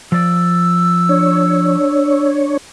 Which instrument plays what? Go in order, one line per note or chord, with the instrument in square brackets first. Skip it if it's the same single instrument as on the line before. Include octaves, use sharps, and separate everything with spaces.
[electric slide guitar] F3 D5 [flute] E6
[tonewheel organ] D4 C#5